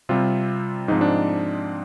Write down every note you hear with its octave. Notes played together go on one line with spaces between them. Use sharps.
C3 G3 C4 F4
G#2 F3 C4 D#4
D4